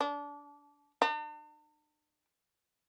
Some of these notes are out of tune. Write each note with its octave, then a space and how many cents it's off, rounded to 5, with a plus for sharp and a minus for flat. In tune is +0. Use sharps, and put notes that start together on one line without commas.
D4 -25
D4 +45